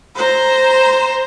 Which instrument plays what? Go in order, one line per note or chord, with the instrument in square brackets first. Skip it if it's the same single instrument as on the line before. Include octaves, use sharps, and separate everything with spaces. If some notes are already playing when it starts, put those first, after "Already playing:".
[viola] C5 A#5